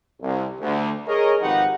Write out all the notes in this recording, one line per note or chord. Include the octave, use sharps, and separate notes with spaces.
C2
D2
G#4 A#4 C#5 D#5
G#1 F3 D#4 G4 B4 F#5